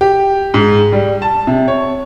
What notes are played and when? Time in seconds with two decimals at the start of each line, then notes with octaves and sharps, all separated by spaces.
0.01 G4
0.54 G#2
0.92 G3
1.22 A5
1.47 C3
1.68 C#5